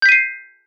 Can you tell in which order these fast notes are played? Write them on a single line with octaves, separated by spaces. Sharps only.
G6 B6 D#7 C7